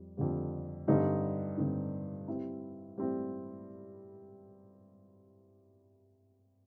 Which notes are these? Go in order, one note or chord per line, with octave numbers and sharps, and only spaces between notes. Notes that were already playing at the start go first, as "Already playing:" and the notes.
Already playing: F2 G3
F2 D3 G3
G2 D3 G3 C4 D#4
G2 D3 G3 C4 D#4
G3 C4 E4
G3 C4 E4